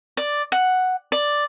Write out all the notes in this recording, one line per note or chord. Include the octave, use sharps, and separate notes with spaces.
D5
F#5
D5